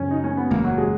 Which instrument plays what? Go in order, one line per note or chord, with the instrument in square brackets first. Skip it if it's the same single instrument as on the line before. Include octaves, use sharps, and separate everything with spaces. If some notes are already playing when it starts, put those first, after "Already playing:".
Already playing: [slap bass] F#2 C#3 F#3 [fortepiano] C#4
[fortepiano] D#4
C#4
B3
[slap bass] F#1 E2 C#3 [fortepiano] A#3
[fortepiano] F#3
G#3